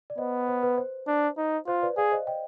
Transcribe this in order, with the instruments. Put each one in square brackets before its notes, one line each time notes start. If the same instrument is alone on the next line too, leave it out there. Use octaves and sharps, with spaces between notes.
[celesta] D5
[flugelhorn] B3 [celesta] C5 D#5
[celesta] C5
B4
C5
[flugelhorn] D4
D#4
[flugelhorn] F4 [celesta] C5
[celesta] B4 D5
[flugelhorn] G#4 [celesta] D5 F5
[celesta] C5 D#5
D#5 G5